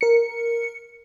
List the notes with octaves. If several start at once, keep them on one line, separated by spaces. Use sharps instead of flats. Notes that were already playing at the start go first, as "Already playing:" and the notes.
A#4 C#7